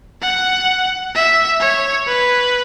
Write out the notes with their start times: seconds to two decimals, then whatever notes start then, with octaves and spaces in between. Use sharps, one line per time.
0.22 F#5
1.15 E5
1.60 C#5
2.07 B4